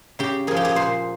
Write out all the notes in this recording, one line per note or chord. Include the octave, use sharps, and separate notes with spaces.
C#3 G4
F3 A#3 G#4
G4
G#4
A#2 C5